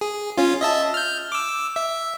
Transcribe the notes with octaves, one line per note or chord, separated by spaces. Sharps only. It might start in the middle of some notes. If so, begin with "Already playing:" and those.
G#4
C#4 F4
D#5 E5 A5
F6 G6
D6 E6
E5